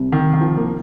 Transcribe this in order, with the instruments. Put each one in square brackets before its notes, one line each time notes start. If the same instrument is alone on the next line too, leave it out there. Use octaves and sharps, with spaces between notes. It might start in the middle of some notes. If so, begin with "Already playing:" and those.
Already playing: [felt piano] C2 C3 G3
[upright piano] D#3
D#3
F3
A#3